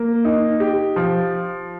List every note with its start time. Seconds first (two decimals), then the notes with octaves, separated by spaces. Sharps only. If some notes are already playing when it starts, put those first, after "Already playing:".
Already playing: A#3
0.25 D#4
0.60 G4
0.96 F3